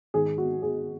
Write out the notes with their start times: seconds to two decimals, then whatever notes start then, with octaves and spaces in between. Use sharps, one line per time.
0.14 G#2 D#3 G#4
0.38 F#4
0.62 G#4